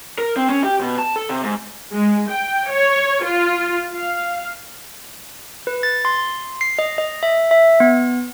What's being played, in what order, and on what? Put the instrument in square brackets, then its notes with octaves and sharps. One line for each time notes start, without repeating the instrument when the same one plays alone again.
[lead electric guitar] A#4
C4
C#4
G4
B2
A5
A4
C3
G#2
[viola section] G#3
G5
C#5
F4
F5
[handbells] B4
A6
C6
C7
D#5
D#5
E5
E5
B3